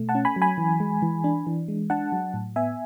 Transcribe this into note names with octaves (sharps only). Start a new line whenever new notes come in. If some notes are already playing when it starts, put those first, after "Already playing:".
Already playing: B2 A3
F#5 A5
C#4
G#5 B5
F#3
G#5 B5
E3
G#3
E3
D4
E3
G#3
D4 F#5 A5
F#3
A2
B3 E5 G#5